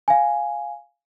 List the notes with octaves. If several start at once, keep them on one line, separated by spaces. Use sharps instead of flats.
F5 G#5